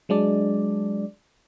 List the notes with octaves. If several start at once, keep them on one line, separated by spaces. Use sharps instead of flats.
F#3 G#3 D4 D5